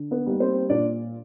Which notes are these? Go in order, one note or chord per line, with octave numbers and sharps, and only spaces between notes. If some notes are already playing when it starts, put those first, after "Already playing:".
Already playing: D3
B3 B4
G3 A#3 D#4
C4 C5
A#2 D4 D5